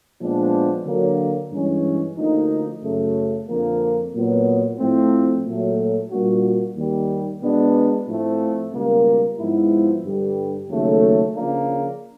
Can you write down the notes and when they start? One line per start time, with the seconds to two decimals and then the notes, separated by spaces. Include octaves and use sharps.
0.21 A#2 F3 G#3 B3 D4
0.86 D3 F#3 A#3
1.52 G2 E3 G#3 C#4
2.17 D2 D3 F3 A#3 D#4
2.82 F#2 C#3 F#3 A3
3.49 F2 D3 F3 A#3
4.14 A#2 F#3 B3
4.79 A2 F3 A3 C4
5.45 A#2 F#3 A3
6.11 A#2 G3 A#3 D4 F#4
6.77 D#2 D#3 G3
7.42 B2 G#3 B3 D4
8.07 A2 F3 A3 C4
8.73 C#2 B2 G3 A#3
9.39 G#2 F3 G#3 B3 E4
10.04 G2 D3 G3
10.70 D#2 C#3 F#3 A3
11.35 C#3 F3 A#3 D4